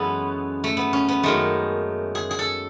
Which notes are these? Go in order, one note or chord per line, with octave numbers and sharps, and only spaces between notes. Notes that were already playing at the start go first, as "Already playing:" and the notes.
Already playing: F#2 E3 G#3 B3 C#4 A4 C#5
A3
B3
C#4
B3
F#2 D#3 G#3 A3
G#4
G#4
A4